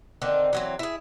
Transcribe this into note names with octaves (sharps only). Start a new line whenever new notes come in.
D3 D#3 C4
E3 F#3 C4
E4 G#4